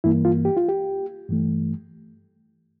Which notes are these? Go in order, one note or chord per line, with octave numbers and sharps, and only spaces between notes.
G2 E3 A#3 E4
F4
G4
F4
G4
G2 E3 A3